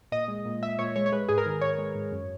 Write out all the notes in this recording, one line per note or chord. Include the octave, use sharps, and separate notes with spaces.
A#2 D#5
G#3
A#2
A#2 E5
A#2 C#5
G#3 C#5
C#5
G#3 B4
G#2 G#4
A#4
D#3
G#2 C#5
G#3
G#2
F#2